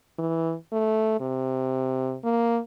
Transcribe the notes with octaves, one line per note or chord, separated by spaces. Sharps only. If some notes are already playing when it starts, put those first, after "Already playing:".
E3
A3
C3
A#3